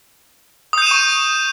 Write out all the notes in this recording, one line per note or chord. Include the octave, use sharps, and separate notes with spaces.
C#6 D#6 G6 D#7 E7